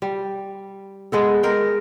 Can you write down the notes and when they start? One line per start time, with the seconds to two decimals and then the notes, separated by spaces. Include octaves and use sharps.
0.02 G3
1.12 G#3 B3 A4
1.43 G#3 A#4 G5